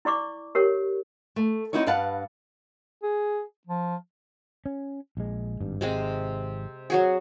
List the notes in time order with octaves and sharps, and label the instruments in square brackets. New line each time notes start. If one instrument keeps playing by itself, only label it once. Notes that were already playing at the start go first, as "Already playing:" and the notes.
[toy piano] E4 D5 C#6 D6
G4 A#4 C#5
[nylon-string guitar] A3
C4 C#4 D#4 E4 F#4 C#5
G2 B4 F5 F#5 A5
[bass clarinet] G#4
F3
[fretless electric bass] C#4
A#1 G#3
G#1 G2
[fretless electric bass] G#1 [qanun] C3 G#3 C4
[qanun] F#3 F#4 G#4